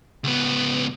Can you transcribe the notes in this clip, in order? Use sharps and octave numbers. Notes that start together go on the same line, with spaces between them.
C#2 B3